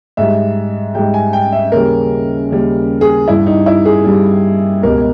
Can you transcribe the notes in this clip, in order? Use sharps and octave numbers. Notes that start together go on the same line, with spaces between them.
G#2 G3 E5
G#2 G3 G5
G#5
G5
E5
D#2 C#3 G3 A#4
D#2 C#3 G3
G#4
G2 G3 E4
D#4
E4
G#4
G2 G3
C#2 B2 G3 A#4